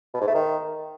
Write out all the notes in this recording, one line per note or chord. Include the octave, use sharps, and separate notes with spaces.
B2
G#2
A3
D#3